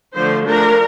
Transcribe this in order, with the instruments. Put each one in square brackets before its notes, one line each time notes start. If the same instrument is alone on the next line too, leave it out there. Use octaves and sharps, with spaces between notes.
[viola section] D3 F3 A3 C5
F3 A3 D4 A#4